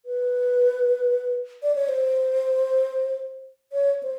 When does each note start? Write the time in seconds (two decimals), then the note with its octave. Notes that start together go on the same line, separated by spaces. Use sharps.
0.06 B4
1.63 D5
1.75 C#5
1.88 C5
3.73 C#5
4.03 C5